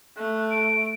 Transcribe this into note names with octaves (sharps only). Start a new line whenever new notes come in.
A3 F#6
D7